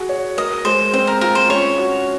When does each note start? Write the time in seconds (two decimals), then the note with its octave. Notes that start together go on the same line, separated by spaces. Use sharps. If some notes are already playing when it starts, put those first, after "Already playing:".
Already playing: F#4 G#4
0.09 C#5
0.37 A#4 D#5
0.65 G#3 C5
0.94 C4 C5
1.07 A#4
1.21 F4 A#4
1.35 C5
1.49 C#4 C#5
1.78 F#4